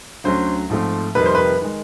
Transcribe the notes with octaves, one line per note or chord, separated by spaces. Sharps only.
D2 D3 F#3 A3 C#4 C5
G#2 F3 A3 C4
F2 C3 D#3 G3 A#3 B4
C5
B4
D#3 G#3